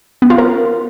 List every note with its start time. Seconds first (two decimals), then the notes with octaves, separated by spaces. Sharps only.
0.22 B3
0.30 F4
0.38 A#4